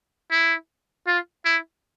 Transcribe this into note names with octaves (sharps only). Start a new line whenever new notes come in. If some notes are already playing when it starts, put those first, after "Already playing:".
E4
F4
E4